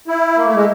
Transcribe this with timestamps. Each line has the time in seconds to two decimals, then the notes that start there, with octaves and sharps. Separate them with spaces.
0.08 E4
0.37 A#3
0.45 A3
0.55 G#3